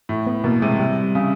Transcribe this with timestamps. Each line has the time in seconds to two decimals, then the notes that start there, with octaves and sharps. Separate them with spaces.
0.09 A2
0.27 B3
0.44 B2 A#3
0.62 C3 G#3
0.80 G3
1.15 C#3